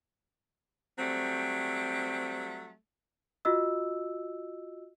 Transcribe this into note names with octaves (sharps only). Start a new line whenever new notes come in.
F#3 G3 A3 C4
F4 F#4 D#5 E6